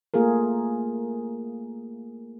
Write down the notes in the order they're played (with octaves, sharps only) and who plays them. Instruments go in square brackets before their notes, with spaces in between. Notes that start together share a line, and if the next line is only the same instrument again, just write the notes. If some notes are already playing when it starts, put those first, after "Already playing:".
[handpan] A3 A#3 F4 G#4 A#4